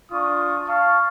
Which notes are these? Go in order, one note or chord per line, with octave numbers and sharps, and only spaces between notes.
D4 F4 C#6 D#6
F5 A5 C#6